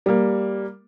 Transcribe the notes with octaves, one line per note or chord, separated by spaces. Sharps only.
G3 A#3